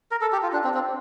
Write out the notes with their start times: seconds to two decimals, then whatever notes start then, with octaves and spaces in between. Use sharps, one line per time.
0.11 A#4
0.21 A4
0.32 G4
0.43 F4
0.53 D4
0.64 C4
0.74 C4